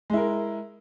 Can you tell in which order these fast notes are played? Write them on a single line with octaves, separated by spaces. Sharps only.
G#3 E4 A#4